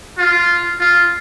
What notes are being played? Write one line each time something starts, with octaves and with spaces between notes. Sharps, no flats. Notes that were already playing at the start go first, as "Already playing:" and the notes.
F4
F4